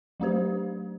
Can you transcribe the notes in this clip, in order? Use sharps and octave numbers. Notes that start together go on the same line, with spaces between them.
F#3 A3 D4 G4 C5